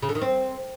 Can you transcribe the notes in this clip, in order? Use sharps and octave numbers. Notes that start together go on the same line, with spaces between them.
C#3
D3
D#3
C4